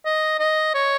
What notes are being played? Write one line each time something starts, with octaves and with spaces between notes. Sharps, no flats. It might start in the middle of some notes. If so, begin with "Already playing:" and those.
D#5
D#5
C#5